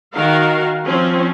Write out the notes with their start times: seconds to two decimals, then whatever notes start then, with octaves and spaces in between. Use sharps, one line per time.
0.15 D#3 F#4 A#4 F5
0.85 F3 C4 C#4